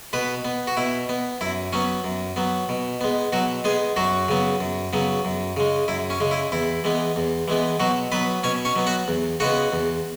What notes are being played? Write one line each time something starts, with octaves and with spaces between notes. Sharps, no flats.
B2 B3 B4
B3
F#4
B2 E4
B3
F#2 E4
F#3 B3 C#4
F#2
F#3 B3
B2
G#3 B3
B2 F#3 F#4
G#3 B3 G#4
F#2 F#3 F#4
C#3 F#3 B3
F#2
C#3 F#3 B3
F#2
C#3 G#3
F#2 E4
C#4
C#3 G#3
E4
E2 E4
E3 G#3 B3
E2
E3 G#3 B3
B2 F#3 F#4
F#3 B3 B4
B2 C#4 C#5
C#4 C#5
F#3 B3
F#4 F#5
E2
C#3 G#3 B3 F#4 F#5
E2